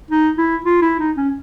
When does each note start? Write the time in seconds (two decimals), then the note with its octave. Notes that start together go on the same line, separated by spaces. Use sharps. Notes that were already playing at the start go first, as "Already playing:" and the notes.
0.11 D#4
0.38 E4
0.65 F4
0.82 E4
0.99 D#4
1.17 C#4